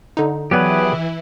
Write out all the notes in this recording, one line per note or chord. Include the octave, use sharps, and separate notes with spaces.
D3 D#4
E3 F#3 B3 E4 G4 G#4 B4 D5